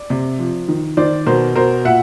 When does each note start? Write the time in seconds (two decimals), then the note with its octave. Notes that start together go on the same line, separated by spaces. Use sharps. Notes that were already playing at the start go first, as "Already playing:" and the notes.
Already playing: D5
0.10 C3
0.39 F3
0.68 D#3
0.97 D#3 C5 D5
1.27 B2 A#4 C5
1.55 B2 A#4 C5
1.85 A#2 E5 F#5